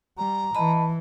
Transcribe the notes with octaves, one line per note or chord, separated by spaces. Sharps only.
G3 A#5
E3 D#5 A5 B5